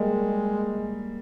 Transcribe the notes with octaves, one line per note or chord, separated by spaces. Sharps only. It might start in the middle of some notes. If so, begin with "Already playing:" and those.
Already playing: G3 G#3 A#3